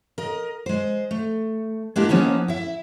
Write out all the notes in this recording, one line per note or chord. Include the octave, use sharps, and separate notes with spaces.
A#4 D#5
G#3 C5
A3
G#3 A#3 D4 E4 G4 A#4
F3 A#3 B3 C#4 D#4
E4 E5